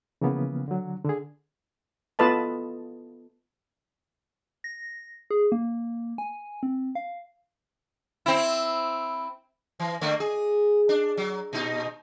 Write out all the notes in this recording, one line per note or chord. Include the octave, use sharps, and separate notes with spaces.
C#3 E3 F3 A#3 B3
D3 F#3
D3 G#4
B3 F4 A4 B4 D#5 A5
A#6
G#4
A#3
G#5
C4
F5
C4 E4
E3
D3 A3 A#3
G#4
D4
F#3
A#2 D#4